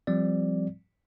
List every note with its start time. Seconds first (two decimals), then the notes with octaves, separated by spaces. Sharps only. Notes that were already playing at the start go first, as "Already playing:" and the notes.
0.07 F3 G3 C4 D5